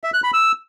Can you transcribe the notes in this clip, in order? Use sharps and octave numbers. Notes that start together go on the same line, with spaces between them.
E5
F#6
B5
E6